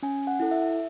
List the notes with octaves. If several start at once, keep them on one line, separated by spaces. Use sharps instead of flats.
C#4 G#5
F#5
E4 A4
E5